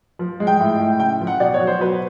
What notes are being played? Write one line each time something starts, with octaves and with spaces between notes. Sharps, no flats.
F3
G#3
G5
A2
A2
C#3 G5
F3
F#5
B2 D5
C#5
F#3
C5
F#3 B4